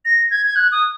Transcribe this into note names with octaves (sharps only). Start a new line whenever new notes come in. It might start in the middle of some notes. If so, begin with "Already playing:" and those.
A#6
G#6
G#6
F#6
D#6